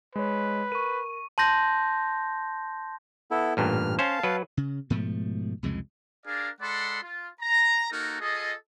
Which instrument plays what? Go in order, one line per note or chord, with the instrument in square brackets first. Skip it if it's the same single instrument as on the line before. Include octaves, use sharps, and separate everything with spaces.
[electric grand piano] G#3 C#5 [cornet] B4
[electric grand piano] A#4 [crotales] C#6 D#7
[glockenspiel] A5 C6 G6 A#6
[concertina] B3 E4 A4
[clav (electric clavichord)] A1 G2 A#2 [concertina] F6
[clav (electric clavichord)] C#4 C5 [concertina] F5 A5
[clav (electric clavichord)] F#3 B4
[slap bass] C#3
G#2 B2 F3 A3
C2 F2 C#3 G#3
[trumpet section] D4 G#4 A#4 D5 F5
G#3 A4 D5 F#5 B5 C6
F4
A#5
A#3 D#4 F#4 A4 A#4
F4 G#4 A4 D#5